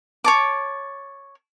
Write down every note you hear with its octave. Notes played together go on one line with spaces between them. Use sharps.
C#5 A5 D6